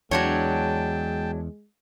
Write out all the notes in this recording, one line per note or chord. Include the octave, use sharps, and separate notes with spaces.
E2 F#3 G#3 D4 C#5 G5 A5